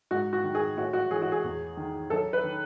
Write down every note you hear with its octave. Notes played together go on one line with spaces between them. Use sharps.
G#2 F#4
F#4
D#3
G#4
A2 F#4
F#4
E3 G#4
F#4
G#4
E2
D#3
F#2 A4
B4
D#3